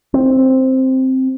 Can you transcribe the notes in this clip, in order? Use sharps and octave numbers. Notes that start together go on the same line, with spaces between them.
C4